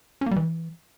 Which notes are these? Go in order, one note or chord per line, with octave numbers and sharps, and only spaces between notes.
C#4
A#3
G3
E3